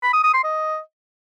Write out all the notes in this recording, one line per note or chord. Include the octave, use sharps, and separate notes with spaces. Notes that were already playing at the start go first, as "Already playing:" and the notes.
B5
D#6
D#6
C6
D#5